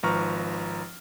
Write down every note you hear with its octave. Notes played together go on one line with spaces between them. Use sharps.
G#1 F3 B4 A#5 C#6 F6